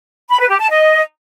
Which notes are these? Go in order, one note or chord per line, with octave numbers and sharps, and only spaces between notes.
B5
B4
G4
A5
D#5